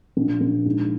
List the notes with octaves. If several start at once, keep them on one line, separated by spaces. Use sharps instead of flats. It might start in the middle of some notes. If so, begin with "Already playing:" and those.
A#1
A#1
G#2